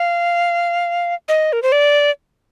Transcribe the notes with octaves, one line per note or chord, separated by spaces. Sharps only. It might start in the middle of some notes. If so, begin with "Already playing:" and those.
Already playing: F5
D#5
A#4
C5
D5